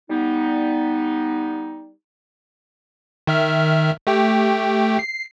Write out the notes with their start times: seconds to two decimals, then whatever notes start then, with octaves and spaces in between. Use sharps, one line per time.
0.10 G3 B3 D#4
3.27 D#3 E5 F6
4.07 A3 G4 G5
4.99 C7